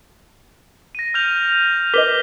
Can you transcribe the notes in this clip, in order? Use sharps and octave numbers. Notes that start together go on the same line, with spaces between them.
A#6 D#7
F6 G6 F7
A#4 B4 D#5 D6 B6 G7